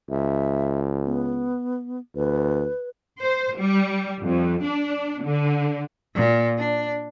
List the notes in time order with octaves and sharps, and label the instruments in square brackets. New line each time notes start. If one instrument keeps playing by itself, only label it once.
[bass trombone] C#2 [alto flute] E5
[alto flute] B3
[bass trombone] D2 [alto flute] B4
[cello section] C5
G3
F2
D4
D3
[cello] A#2
D4